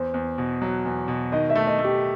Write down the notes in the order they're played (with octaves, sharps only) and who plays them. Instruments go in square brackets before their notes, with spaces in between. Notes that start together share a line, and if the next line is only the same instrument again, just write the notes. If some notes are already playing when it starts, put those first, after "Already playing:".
Already playing: [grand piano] E2 [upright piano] C5
[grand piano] E2
B2
F#3
E2
B2
[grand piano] D#3 [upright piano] D#5
[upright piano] E5
[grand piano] A3
[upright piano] D#5
[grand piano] A3
[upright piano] G4